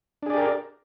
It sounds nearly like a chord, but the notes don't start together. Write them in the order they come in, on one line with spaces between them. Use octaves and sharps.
D4 G#4 D5 G4 A#4